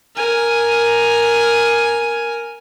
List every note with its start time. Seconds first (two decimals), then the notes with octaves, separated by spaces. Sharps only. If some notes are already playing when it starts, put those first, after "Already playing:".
0.15 A#4 G#5